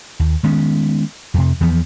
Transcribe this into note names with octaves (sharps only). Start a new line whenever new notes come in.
D#2
D#3 G#3 B3 C#4
F2 C3
E2 E3 F3 B3